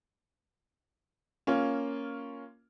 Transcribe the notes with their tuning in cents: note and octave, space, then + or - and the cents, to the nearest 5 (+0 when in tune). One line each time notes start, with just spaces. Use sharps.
A#3 +0 C#4 +0 F4 +0